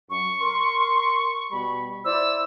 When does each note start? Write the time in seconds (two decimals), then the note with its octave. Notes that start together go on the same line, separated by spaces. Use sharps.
0.10 F#2 C#6
0.41 A#4 C6
1.51 B2 G3 B5
2.05 E4 C5 D5 E6